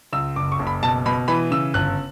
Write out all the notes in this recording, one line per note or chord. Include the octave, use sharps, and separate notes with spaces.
C#2 E6
F#1 D6
C#6
F#1
B5
B2 A5
B2 B5
E3 B5
C#3 E6
G1 F#6